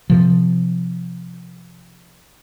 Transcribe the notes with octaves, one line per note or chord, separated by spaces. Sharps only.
C3 F3